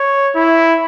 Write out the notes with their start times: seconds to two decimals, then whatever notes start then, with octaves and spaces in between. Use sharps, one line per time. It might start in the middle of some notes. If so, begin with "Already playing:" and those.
Already playing: C#5
0.35 E4